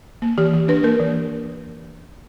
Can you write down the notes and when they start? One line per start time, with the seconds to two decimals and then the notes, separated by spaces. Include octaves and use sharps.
0.22 A#3
0.38 E3 G4
0.54 E3
0.68 D4 B4
0.84 A#3 A#4
1.00 E3